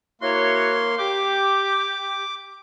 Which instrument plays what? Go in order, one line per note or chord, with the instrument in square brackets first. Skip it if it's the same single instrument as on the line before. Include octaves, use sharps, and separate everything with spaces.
[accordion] A#3 C6 [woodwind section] E4 F#4 C#5
[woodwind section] G4 [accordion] D6